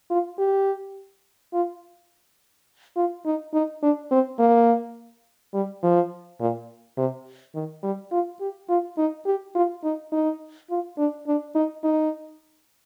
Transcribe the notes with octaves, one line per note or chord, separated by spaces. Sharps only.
F4
G4
F4
F4
D#4
D#4
D4
C4
A#3
G3
F3
A#2
C3
D#3
G3
F4
G4
F4
D#4
G4
F4
D#4
D#4
F4
D4
D4
D#4
D#4